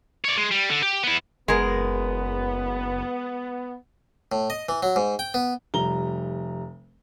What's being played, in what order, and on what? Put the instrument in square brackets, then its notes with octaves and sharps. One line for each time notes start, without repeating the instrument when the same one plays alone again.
[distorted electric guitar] C#5 D5
G#3
G3
D3
G4
B3 E4
[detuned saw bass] F#1 [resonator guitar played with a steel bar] G#3 A#4 [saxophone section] B3
[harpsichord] A2
D#5
E3
F#3
G#2
G5
B3
[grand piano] F1 G3 A#5 G7